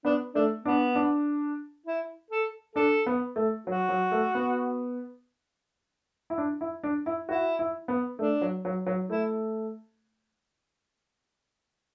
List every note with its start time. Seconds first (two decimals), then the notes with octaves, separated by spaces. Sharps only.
0.05 B3 D4
0.35 A3 D4
0.64 B3 D4
0.95 D4
1.86 E4
2.31 A4
2.76 D4 A4
3.06 B3
3.36 A3
3.67 F#3 F#4
3.89 F#3
4.12 A3
4.35 B3
6.30 E4
6.38 D4
6.61 E4
6.83 D4
7.06 E4
7.29 E4 F#4
7.59 E4
7.88 B3
8.19 A3 D4
8.41 F#3
8.65 F#3
8.86 F#3
9.10 A3 E4